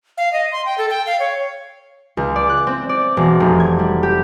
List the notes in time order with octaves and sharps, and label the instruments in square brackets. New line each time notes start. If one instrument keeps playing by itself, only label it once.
[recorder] F5
D#5
C6
G5
A4
G5
F5
C#5
[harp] C#2
D5
F#6
C4
D5
E1
F1
G#6
G3
G4